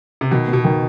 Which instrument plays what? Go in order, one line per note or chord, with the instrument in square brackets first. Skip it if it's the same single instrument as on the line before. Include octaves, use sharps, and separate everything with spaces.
[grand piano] C3
[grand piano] B2 [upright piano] D#3
[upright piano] B3
[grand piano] B2
[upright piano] D#3